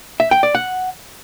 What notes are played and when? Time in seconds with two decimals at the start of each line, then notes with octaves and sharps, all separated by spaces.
0.20 E5
0.31 G5
0.43 D5
0.55 F#5